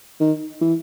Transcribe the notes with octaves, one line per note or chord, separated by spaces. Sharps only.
D#3
E3